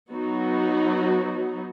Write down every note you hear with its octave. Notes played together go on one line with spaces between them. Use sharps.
F#3 B3 D#4 F#4